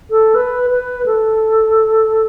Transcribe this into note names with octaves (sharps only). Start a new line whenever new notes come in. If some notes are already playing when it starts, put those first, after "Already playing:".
A4
B4
B4
A4